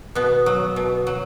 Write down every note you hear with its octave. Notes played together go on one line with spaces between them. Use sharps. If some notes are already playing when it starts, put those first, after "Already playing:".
B2 B3
F#3
B2
F#3